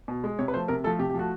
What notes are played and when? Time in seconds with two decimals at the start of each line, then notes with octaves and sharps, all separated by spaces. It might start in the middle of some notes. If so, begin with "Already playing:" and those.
0.08 B2
0.24 G#3
0.39 C3 C#5
0.48 B4
0.54 F3 A3 C5
0.68 C3 A#4
0.84 F3 A3 A4
0.99 C3 G4
1.10 G4
1.14 F3 A3 F#4